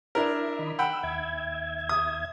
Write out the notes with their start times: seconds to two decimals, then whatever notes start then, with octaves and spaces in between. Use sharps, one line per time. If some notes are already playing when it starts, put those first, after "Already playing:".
0.15 D4 E4 A#4 E5
0.59 D#3 D#5 B5
0.79 F#5 G5 B5 E6
1.03 D#2 E5 G#6
1.89 D#6